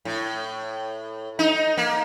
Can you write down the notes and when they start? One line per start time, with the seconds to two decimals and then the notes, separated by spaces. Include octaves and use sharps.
0.05 A2
1.39 D#4
1.77 A#3